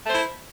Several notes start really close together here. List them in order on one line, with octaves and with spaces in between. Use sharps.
A3 C5 E4